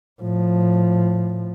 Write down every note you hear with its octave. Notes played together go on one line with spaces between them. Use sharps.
A2 F3